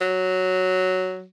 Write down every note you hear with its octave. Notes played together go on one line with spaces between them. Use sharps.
F#3